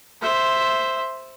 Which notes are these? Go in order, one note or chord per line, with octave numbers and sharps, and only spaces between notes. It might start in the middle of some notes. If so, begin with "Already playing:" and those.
C5 E5